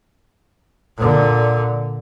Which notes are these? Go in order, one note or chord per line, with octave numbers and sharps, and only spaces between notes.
A#2 D3